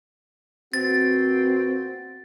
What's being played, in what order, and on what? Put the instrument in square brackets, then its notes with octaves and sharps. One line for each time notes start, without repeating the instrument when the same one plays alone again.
[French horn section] A#2 B3 F#4 [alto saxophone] C4 [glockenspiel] A6